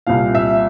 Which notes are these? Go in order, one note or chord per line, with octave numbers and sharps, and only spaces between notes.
C2 A#2 F5
E5